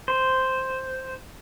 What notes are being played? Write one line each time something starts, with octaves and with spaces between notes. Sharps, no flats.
C5